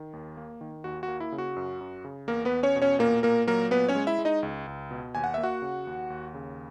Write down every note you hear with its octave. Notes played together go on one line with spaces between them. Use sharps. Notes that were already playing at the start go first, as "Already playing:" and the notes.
Already playing: D#3
D#2
A#3
D#3
D#2 F#4
F#4
A#3
E4
C#3
F#4
F#2
F#2
C#3
E2 A#3 A#4
B3 B4
E2
C#4 C#5
B2
C#4 C#5
A#2 A#3 A#4
A#2 A#3 A#4
F#3 A#3 A#4
A#2 B3 B4
C#4 C#5
G#3
E4 E5
G#3
D#4 D#5
C#2
C#2
B2
D#2 G#5
F#5
A#3 E5
F#4 F#5
C#3
D#2
D#2
C#3